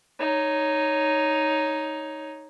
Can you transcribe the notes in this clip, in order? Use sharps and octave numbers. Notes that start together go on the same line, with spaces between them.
D#4 C#5